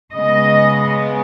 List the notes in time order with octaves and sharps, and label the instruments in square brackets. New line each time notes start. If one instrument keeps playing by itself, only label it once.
[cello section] C#3 G#3 B3 D#5